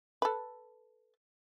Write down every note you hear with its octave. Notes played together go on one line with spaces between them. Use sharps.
A4 B4